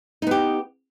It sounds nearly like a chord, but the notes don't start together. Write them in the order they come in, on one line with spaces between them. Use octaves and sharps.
D#4 B3 G4